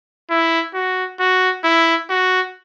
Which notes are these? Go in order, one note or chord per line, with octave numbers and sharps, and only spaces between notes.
E4
F#4
F#4
E4
F#4